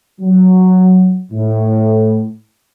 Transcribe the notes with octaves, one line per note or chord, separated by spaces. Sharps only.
F#3
A2